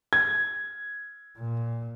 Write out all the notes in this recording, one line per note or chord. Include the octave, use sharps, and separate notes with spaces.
G#6
A#2